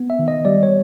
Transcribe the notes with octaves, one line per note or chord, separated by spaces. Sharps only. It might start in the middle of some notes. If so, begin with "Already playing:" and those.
Already playing: B3
E5
D#3
D#5
G3 D5
C#5